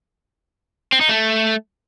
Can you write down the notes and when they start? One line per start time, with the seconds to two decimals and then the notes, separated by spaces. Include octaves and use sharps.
0.92 C4
1.01 D#4
1.09 A3